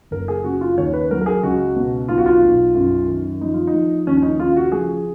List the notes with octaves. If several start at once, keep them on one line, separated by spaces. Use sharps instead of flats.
F#1 A#4
G#4
C#3 F#4
F4
D#2 C#5
B4
F#3 A#4
A#4
G#4
C#2 F#4
B2
B1 F4
F#4
F4
B1
F#2
D#3
F3 D#4
F4
D#4
F3
D#2 C#4
C#4
D#4
C#3 F4
F#4
F3 G#4